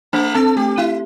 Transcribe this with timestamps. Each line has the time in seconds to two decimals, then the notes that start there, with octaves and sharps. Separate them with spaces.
0.13 A3 D4
0.35 C4 A4
0.56 A3 G4
0.78 E4